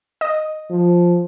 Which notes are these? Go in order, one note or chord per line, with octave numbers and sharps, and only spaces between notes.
D#5
F3